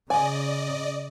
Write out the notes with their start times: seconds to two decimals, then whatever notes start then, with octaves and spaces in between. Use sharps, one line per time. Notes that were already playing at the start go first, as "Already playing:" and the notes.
0.10 C#3 D5 D#5 G#5